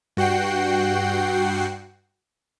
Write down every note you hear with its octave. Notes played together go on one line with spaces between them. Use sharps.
G2 F#4 F#5 G5 C7